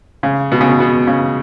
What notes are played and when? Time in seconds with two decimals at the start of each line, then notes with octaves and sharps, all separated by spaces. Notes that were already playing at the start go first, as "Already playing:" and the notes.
0.23 C#3
0.52 B2
0.61 C#3
0.69 B2
0.80 B2
1.07 C#3